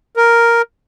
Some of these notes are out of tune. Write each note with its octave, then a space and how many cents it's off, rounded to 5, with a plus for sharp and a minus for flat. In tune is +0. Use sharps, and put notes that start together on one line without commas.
A#4 +0